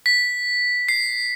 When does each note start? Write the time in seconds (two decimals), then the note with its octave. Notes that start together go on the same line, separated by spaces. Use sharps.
0.06 B6
0.89 C7